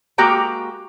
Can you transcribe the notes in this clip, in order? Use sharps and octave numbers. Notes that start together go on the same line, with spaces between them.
G#3 A#3 F#4 G4 G5 A#5